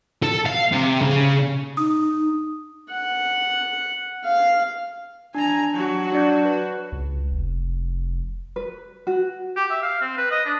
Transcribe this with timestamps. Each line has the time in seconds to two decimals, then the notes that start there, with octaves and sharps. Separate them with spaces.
0.23 A4
0.46 F5
0.72 C3
1.01 C#3
1.77 D#4 D#6
2.92 F#5
4.24 F5
5.35 D4 G#5 A#5
5.73 F#3 F#4
6.12 D4 D5 G6
6.45 B4
6.92 C#2
7.31 F1
8.56 B4
9.07 F#4
9.56 G4
9.70 E5
9.82 F5
10.01 C4
10.17 B4
10.31 D#5
10.45 D4